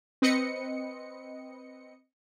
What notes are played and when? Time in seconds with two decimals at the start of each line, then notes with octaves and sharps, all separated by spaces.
0.22 C4 B4 D#5 C#7